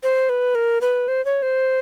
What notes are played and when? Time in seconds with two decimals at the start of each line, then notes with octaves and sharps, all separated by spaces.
0.03 C5
0.29 B4
0.55 A#4
0.81 B4
1.08 C5
1.25 C#5
1.42 C5